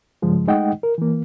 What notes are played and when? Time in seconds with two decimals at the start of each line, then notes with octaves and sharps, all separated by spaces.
0.22 G2 C#3 F3 G#3
0.47 G#3 A3 D#4 D#5 F#5 G5
0.83 A#4
0.98 E3 A#3